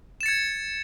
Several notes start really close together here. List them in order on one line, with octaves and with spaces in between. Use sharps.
E7 A6 C#7 G#6